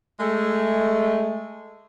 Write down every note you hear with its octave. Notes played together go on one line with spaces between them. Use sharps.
G#3 A3